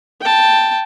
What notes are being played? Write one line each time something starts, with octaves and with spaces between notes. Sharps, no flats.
G5 A5